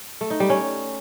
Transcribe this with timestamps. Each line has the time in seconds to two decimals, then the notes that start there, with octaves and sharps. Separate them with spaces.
0.21 A3
0.30 D#4
0.40 G3
0.50 C#4